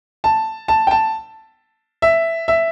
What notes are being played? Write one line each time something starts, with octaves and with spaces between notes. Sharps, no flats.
A5
A5
G5
A5
E5
E5